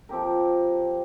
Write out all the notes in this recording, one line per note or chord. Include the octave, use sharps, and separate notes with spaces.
F3 C4 G4 A#4